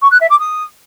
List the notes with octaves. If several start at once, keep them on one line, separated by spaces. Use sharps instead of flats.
C#6
F#6
E5
D6
D#6